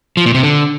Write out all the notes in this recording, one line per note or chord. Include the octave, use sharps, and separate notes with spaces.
F3
A#2
C3
D3